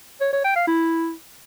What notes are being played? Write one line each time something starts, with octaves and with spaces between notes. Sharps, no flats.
C#5
C#5
G5
F5
E4